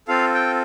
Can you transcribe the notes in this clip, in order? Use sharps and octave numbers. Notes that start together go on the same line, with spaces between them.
C4 F4 A4 F5
G5